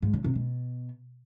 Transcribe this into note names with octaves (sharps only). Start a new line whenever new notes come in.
G#2
C#3
C3
B2